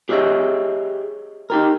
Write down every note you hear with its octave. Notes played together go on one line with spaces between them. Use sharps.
G4 G#4 C#5 D#5 E5
D#4 G4 A#4